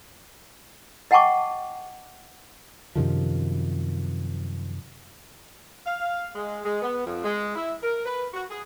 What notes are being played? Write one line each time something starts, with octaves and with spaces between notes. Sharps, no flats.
D#5 F#5 G5 A5 C#6 D6
F#2 C3 D#3 F3
F5
G#3
G#3
B3
F2
G#3
E4
A#4
B4
F#4
G#4